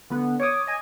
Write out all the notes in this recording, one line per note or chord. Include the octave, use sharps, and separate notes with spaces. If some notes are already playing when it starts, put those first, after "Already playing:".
D3 B3
C#5 D6 D#6
D#5 G#5